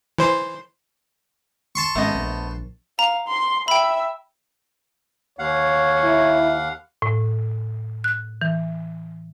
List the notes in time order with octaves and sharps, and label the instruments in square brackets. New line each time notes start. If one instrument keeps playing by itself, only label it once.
[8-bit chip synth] E3 C5 C6
[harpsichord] A5 C6 C#6
[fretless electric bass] G#1 G#3 C#4 [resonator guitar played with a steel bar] A3 B3 D#5
[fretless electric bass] A#1
[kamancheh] F5 [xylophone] A#5
[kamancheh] C6
[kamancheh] E5 [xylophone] G5 B5
[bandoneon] D#2 F5 F#5 [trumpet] C#5
[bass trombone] E4
[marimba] A2
F#6
E3